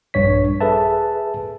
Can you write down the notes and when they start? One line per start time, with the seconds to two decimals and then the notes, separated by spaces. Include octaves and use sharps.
0.14 A#1 G2 C#5 B6
0.61 G#4 A4 B4 E5 A5